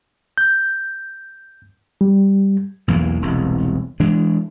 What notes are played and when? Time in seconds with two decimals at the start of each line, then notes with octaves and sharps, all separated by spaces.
0.38 G6
2.01 G3
2.88 B1 E2 E3 A#3
3.22 E1 C2
4.00 E3 G#3 D4